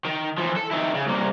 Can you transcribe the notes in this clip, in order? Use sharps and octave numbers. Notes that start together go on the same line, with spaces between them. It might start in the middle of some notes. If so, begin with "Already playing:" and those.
D#3
E3 F3
A4
D#3 E4
C#3
C2 A#3